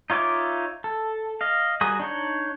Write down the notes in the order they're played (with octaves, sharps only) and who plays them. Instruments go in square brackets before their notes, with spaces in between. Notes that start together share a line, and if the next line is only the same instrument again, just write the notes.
[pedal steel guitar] D#4 F4 C#5 E5 D6
A4
D#5 F5
G3 F#4 G#4 A#4 D#6
D4 D#4 C#5